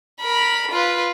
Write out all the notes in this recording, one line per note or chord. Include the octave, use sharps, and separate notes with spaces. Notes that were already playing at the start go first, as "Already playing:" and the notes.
A#4 B5
F4 B4